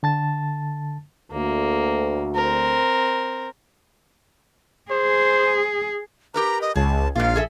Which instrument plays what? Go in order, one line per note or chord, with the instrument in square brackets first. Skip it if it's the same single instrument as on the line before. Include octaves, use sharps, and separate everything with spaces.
[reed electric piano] D3 A5 A6
[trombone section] D2 [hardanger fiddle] A#3
[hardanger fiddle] C4 A#4
[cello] G#4 [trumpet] C5
[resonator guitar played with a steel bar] G4 A#4 B4 [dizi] A#5
[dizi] D#5
[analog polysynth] C#2 [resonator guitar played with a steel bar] G#4 [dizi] A5
[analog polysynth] A#1 [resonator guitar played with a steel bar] G#2 F4 [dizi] F5
[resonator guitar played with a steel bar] G#4 A4 E5